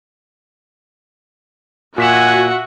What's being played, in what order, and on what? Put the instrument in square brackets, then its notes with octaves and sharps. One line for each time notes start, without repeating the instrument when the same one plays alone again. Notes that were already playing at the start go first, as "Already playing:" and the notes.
[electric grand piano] A#2 B6 E7 [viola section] F#4 [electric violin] E5 F#5 [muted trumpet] G#5